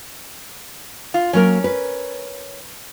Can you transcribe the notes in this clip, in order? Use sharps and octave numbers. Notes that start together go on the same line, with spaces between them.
F4
F#3 A#3 C#4 A#4
B4